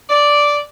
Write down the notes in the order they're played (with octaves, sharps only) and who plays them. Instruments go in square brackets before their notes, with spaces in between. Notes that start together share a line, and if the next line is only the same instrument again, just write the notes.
[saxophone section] D5